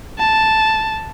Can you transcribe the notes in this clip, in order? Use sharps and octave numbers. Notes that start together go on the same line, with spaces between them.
A5